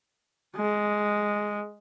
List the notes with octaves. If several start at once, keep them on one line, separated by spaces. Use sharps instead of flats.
G#3